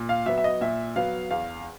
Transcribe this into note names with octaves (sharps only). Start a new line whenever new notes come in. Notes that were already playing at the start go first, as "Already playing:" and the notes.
Already playing: A#2
F5
F#3 B3 E5
E5
D#5
A#2 E5
F#3 B3 F5
E2 F5